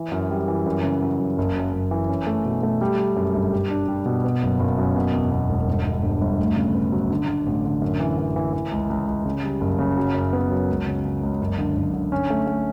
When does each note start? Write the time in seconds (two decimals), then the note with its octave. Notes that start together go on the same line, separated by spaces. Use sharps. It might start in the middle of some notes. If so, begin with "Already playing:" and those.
Already playing: E3
0.12 F#2
0.30 G3
0.48 E3
0.66 F#2
0.84 C#3
1.02 F#3
1.19 F#2
1.38 F#1
1.55 F#2
1.73 F#1
1.91 E3
2.09 C#4
2.27 A3
2.45 B2
2.63 A3
2.81 G3
2.99 G3
3.16 F#2
3.34 G1
3.52 G4
3.70 D4
3.88 G3
4.06 B2
4.24 B3
4.42 F#1
4.59 F#1
4.78 F#2
4.96 B2
5.13 E2
5.32 B2
5.49 E1
5.68 G1
5.85 G1
6.03 G2
6.21 G1
6.39 D2
6.57 C#3
6.74 B3
6.92 F#3
7.10 D3
7.28 D3
7.46 A1
7.65 D3
7.82 F#2
8.00 E3
8.18 E3
8.36 E3
8.53 E3
8.72 C#2
8.90 C#2
9.07 C#2
9.25 C#3
9.44 G3
9.61 F#1
9.79 C#3
9.97 F#3
10.15 F#2
10.33 B3
10.51 F#3
10.69 C#2
10.86 C#3
11.04 C#3
11.23 C#2
11.41 F#1
11.58 D3
11.76 F#1
11.94 D3
12.12 C#4
12.30 A3
12.47 A3